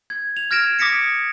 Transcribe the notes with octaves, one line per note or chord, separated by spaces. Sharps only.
G#6
F7
F6 G#6 A#6 D7 E7
D6 D#6 A#6 B6 C#7 D7